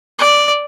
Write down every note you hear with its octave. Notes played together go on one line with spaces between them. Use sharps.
D5